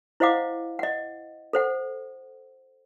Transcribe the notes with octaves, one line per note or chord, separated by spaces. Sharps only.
E4 C5 D#5 F5 F#5 D6
D#5 F#5
A4 C5 F#5